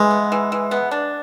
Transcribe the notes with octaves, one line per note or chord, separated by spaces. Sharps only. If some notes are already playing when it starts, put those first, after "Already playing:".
Already playing: E3 G#3
B3
E3
E3
B3
D4